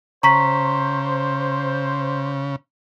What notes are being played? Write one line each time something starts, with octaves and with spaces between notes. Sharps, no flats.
C#3 C5 A#5 C#6 B6